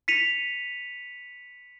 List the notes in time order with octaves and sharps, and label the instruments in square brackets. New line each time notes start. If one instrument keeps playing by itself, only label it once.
[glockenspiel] B6 C#7 D#7 F7